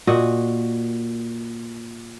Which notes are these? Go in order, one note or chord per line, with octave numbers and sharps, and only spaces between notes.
A#2 F#4 D#5